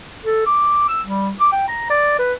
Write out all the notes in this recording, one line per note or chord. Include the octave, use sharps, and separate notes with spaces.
A4
D6
E6
G3
D6
G5
A#5
D5
B4